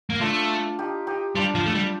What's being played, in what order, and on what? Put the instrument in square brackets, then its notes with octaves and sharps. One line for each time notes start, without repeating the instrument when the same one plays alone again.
[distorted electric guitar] A#3
[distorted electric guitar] A3 [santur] D4 F4
[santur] D#4 G4
D#4 G4
[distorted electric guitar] G3 [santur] D4 F4
[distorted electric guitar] F3
A3
G3